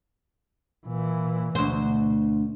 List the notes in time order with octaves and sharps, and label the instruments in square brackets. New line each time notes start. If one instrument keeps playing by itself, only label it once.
[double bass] A#2 E3
[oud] D2 C5 [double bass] B2